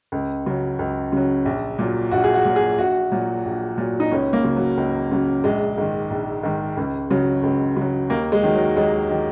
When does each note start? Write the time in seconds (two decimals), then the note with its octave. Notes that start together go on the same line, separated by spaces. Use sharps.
0.12 C#2
0.46 C#3 F#3
0.79 C#2
1.12 C#3 F#3
1.45 A#1
1.79 A#2 F#3
2.11 A#1 F#4
2.24 G#4
2.34 F#4
2.45 A#2 F#3
2.56 G#4
2.78 A#1 F#4
3.12 A#2 F#3
3.45 A#1
3.78 A#2 F#3
4.00 D#4
4.11 C#2 C#4
4.33 A#3
4.44 C#3 F#3
4.56 F#3
4.77 C#2
5.11 C#3 F#3
5.44 A#1 G#3
5.78 G#2 D#3
6.10 A#1
6.43 G#2 D#3
6.77 C#2
7.11 C#3 F#3
7.43 C#2
7.77 C#3 F#3
8.09 D#2 A#3
8.32 G#3
8.43 D#3 F#3
8.55 F#3
8.76 D#2 G#3
9.10 D#3 F#3